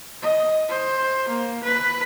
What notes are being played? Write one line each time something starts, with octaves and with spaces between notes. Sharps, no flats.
D#5
C5
A#3
B4